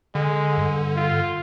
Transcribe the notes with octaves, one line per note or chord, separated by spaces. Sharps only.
D3 G#3
G2
F4